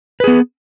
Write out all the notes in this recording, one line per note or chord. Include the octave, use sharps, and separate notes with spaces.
B3 G#4 B4